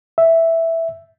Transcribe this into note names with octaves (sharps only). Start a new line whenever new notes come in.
E5